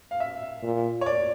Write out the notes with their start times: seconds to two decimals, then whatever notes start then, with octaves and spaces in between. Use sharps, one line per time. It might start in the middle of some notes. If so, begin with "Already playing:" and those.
0.11 F5
0.20 E5
0.63 A#2
1.01 C#5
1.06 D5